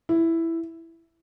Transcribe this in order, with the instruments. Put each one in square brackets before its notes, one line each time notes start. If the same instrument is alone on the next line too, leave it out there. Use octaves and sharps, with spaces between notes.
[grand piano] E4